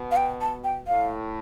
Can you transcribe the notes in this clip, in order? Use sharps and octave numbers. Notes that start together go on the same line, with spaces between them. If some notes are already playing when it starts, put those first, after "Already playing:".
Already playing: B2
F5
G5
A5
G5
A2 F5